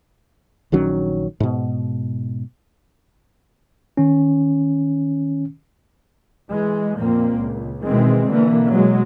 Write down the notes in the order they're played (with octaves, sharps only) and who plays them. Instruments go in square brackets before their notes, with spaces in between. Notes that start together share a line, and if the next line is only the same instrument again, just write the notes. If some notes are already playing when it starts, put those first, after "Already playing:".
[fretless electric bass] A#1 D#3 F#3 C#4
G#2 B2
[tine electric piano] D#3 C#4
[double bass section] E3 G#3
F2 A#2 A#3 C4
C#2
B2 D#3 E3 G#3 C4
B2 D3 E3 A#3
B2 F#3 G#3